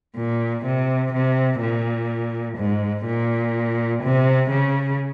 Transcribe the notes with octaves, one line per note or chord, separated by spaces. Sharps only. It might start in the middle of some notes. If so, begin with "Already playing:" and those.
A#2
C3
C3
A#2
G#2
A#2
C3
C#3